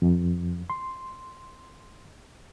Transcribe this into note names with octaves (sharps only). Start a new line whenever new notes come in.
F2
C6